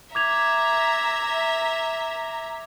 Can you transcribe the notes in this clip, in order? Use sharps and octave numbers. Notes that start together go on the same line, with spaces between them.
E5 A#5 D6 G#6 F7